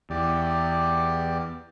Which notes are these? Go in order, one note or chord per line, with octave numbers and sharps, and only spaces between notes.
E2 G4 D5